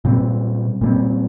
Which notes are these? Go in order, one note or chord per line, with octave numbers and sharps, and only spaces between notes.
A#2 G3 C4
A#2 G3 C4